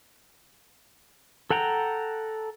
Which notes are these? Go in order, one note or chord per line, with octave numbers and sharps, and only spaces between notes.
A4 F#5 G5 A#5